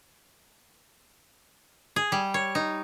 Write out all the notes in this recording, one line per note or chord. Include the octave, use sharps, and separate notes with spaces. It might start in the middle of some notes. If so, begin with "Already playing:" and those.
G#4
G3
C#5
D#4